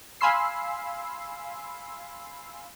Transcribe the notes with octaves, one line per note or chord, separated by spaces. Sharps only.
F5 G#5 B5 C6 E6 C7